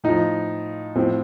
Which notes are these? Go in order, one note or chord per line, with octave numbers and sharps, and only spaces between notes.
A2 F3 D#4
A2 F3 C4